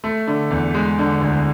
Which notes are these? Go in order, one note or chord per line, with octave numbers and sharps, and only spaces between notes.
A3
D3
E2
G#3
D3
D2